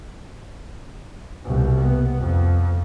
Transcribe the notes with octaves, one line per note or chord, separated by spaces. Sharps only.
C2 B2
B3
F2